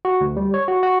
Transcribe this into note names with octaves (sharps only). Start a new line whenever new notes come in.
F#4
D2
G3
C#5
F#4
F#4